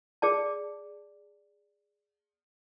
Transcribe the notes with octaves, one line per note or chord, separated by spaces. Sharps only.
G#4 D5 A5